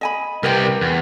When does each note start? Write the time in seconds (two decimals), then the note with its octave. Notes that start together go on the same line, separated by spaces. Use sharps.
0.01 D#5 G#5 B5
0.43 C2 C3 A#4 B4 G5
0.81 E2